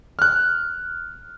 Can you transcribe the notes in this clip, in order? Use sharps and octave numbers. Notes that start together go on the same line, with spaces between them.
F6 F#6